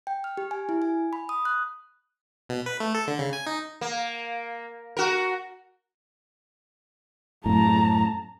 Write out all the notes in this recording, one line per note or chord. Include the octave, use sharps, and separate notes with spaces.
G5
F6
G4
G#5
E4
G#5
B5
D#6
F#6
B2
B4
A3
A4
D3
C#3
G#5
D#4
A#3
F#4 A#4
F#2 A2 A5 A#5